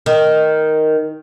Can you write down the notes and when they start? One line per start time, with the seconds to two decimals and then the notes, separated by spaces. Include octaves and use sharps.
0.06 D#3